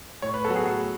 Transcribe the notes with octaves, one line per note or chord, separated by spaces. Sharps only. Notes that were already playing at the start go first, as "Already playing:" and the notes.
A2 C#5
B4
F#3 B3 F#4 A4
G#4
A2 F#4